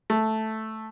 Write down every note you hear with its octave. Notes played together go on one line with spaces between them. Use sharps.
A3